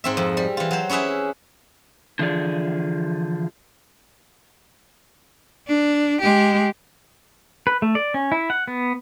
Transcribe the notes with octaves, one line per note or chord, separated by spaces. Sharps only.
G#2 C4 E5
F2
G3
E3 F4
F#3 C5
C#4 E4 G#4 B4 E5
D3 E3 F3 G#4 D5
D4
G#3 G4
B4
A3
D5
C#4
E4
F#5
B3